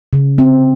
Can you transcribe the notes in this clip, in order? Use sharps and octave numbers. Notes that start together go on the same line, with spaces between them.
C#3
C4